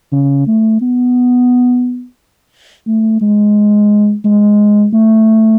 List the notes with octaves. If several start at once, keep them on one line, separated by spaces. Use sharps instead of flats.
C#3
A3
B3
A3
G#3
G#3
A3